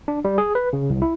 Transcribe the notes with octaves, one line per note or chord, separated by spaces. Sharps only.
D4
G3
G#4
B4
C#3
C2
E4